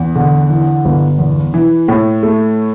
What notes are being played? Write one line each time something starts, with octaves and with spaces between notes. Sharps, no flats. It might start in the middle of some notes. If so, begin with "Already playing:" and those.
Already playing: E2
D3
E3
G1
E2
E3
A2
A3